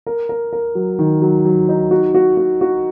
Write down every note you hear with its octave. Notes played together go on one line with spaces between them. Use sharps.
A#4
A#4
A#4
F#3
D#3
F#3
F#3
D#4
F#4
F#4
F#4
F#4